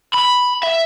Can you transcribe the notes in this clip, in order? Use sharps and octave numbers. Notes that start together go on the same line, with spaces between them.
B5
E5